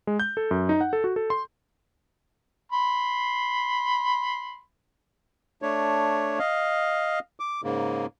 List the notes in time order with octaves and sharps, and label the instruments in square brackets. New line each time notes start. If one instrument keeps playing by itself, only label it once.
[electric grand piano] G#3
G6
A4
F#2
D#4
F#5
A4
F#4
A4
C6
[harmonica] B5 C6
[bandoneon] A3 D4 C#5
D#5 F5
D6
G#2 C#3 A#3